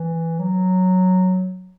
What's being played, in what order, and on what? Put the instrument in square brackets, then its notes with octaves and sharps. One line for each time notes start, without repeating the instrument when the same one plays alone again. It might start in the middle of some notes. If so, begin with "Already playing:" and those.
Already playing: [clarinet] E3
F#3